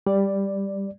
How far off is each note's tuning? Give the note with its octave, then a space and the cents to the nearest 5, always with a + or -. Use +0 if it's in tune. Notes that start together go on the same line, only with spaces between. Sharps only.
G3 +10 D5 +0